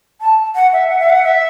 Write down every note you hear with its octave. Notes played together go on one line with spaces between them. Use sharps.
A5
F#5
E5
F#5
E5
F#5
E5